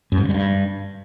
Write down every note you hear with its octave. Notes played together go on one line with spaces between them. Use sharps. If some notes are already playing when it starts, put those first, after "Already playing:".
F#2
G#2
C#3
G3
G2